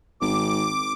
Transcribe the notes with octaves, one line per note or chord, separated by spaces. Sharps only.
G#1 D6